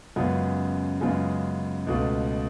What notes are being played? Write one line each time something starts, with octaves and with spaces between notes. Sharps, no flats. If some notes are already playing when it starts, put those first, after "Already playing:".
F#2 C#3 G#3 B3 F4
F#2 C#3 G#3 B3 F4
C#2 B2 A3 F4